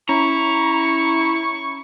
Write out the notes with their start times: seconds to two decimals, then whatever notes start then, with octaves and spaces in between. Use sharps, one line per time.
0.09 C#4 E4 A#5 C#6